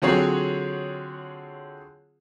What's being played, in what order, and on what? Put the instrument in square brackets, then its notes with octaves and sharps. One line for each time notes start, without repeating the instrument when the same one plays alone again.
[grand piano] D3 F#3 C4 F4 G#4 C#5